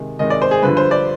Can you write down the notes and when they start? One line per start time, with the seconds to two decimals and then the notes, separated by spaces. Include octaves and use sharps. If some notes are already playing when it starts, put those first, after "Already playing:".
Already playing: C3 D#3 G#3
0.19 C3 D#3 G#3 D#5
0.30 D5
0.42 C5
0.51 G#4
0.63 G2 D3 F3 B4
0.77 C5
0.91 D5